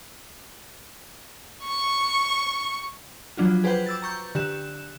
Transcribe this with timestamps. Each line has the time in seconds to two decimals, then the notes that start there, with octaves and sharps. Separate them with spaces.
1.65 C#6
3.37 F3 F#3 D4 F4 F#4
3.64 G#4 B4 C5 F#5 G5 G6
3.86 D6 E6 A6
4.02 A#5 C#6 G6
4.35 D3 G4 F#6 E7